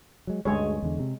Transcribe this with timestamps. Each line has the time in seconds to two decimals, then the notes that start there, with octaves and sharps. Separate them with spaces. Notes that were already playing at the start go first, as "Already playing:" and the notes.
0.27 F#3 G#3
0.45 D2 G2 G#3 G#4 C#5
0.82 E2 D3
0.99 C3